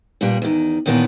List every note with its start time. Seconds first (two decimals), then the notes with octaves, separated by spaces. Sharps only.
0.21 G2 A#2 G3
0.42 E2 D#3
0.86 D#2 A#2 D#3 E3 B3 A5